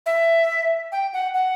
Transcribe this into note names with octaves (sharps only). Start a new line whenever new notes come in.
E5
G5
F#5
F#5